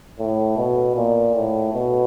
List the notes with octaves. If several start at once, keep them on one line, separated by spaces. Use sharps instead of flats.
A2
B2
A#2
A2
B2